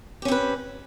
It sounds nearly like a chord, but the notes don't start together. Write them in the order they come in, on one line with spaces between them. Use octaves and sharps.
G4 C#4 C4 B4